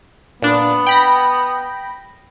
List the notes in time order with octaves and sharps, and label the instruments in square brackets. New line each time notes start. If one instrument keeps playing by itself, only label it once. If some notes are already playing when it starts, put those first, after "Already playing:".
[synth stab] A#2 D4 [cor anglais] B3
[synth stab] G5 B5 A#6